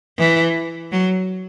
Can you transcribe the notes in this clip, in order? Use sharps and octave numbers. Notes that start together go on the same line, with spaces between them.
E3
F#3